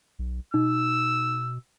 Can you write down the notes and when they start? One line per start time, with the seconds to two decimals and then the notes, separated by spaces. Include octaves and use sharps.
0.19 B1
0.54 B2 D#4 E6